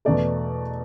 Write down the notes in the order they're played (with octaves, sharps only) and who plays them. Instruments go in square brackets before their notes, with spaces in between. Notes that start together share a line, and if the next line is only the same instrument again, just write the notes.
[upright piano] E2 B2 A3 D5